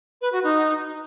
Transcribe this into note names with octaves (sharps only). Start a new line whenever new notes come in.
B4
F#4
D#4